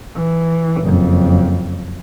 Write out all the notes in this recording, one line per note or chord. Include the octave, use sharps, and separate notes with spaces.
E3
F#1 F2